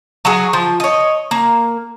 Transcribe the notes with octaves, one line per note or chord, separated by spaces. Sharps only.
F#3 F#4 G#4
F3
C#5 D#5
A#3